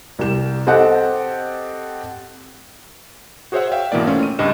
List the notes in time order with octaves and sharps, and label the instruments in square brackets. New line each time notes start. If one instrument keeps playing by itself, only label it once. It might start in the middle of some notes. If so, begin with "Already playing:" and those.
[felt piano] C2 G4 E7
C4 G4 A4 D#5 F#5
[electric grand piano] F#4 G#4 C5 C#5 E5 F#5
E5 F5 G5
G#1 B2 E3 A#3 D5
A3 C4 C#4 F4
D#7
C#2 G2 G4 D#5 E7